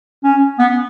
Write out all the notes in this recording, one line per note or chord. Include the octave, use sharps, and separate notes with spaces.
C#4
B3